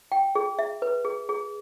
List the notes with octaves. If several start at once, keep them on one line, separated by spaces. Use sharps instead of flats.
G5
G#4
E5
B4
G#4
G#4